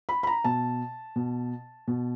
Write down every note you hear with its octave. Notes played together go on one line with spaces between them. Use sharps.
B5
B5
A#5
B2 A5
B2
B2